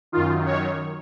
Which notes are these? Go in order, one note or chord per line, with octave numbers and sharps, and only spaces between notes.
F#2 D#3 F4
C#5